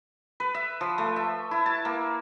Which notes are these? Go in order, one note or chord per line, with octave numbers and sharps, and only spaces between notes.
B4
E5
F3
A3
E5
E4
A5
A#3